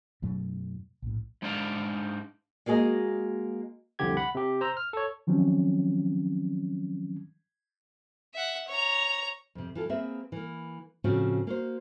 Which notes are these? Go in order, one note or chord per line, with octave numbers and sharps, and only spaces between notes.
F#2 B2 F#3 A3
A#1 A2
G#2 G#3 D4 C5 D5 F5
G#3 A#3 F#4 G#4 D#5
C2 F2 D3 G4 G#6
F#5 B5
C3 G4
C5 A#5 E6
F6
A4 C#5
D#3 F3 F#3 C4 C#4
E5 F#5
C#5 A#5
F2 C3
E3 F4 A4
A#3 C4 G#4 B4 E5
E3 A#3
A2 C#3 F3 C4 C#4 F#4
A#3 F#4 C5